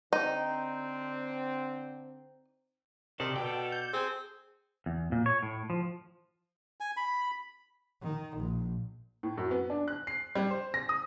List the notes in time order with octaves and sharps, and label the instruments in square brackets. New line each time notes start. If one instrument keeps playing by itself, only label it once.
[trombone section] D3 C4 [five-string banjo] D#4
[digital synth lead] C3 [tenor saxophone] D#3 [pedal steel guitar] A4 D5
[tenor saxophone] B2 [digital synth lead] G5
[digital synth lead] G6
[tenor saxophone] C4 [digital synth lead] G#4
[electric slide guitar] E2
A#2
C#5
A2
F3
[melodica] G#5
B5
[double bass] D#3
A#1
[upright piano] A2
F#2
B3
D4
F#6
C7
G3
C5
A#6
D#6